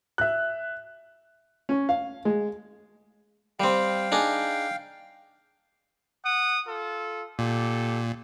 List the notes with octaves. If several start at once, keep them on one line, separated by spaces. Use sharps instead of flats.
E5 F#6
C#4
F5
G#3
G3 C4 F5 G5
D4 D#4 G#4
F#5 D#6
F4 A4
A#2 G4 A4